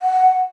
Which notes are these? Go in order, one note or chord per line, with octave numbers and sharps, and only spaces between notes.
F#5